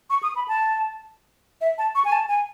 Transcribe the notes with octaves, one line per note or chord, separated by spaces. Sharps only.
C#6
D#6
B5
A5
E5
A5
C#6
G#5
A5
G#5